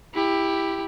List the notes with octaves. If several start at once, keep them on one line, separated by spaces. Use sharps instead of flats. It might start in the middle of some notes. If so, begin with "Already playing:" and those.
E4 G4